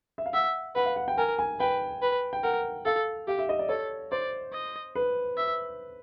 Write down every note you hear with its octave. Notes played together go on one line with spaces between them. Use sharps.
E5
F5
E5 F#5
B4 F#5
F5
F#5
G5
A#4 G#5
G#5
B4 G5
B4
G5
A#4 F#5
A4 F5
G4 F5
E5
D#5
D5
A4 C#5
C5 D5
D#5
B4
E5